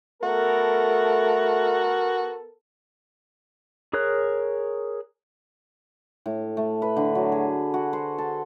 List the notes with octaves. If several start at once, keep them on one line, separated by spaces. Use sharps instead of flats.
A3 B3 F#4 A4 A#4
G#4 A#4 C#5 F#6
A2
A3
B4
D3
F#3
G#4
F#4
C5
A4